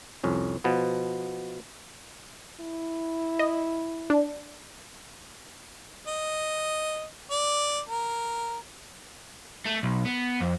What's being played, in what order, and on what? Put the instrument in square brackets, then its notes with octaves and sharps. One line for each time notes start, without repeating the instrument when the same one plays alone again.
[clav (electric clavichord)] C2 F2 C#4
B2 F3 B3
[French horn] E4
[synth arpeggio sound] D#5
D4
[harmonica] D#5
D5
A#4
[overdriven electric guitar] A3
B1
B3
F2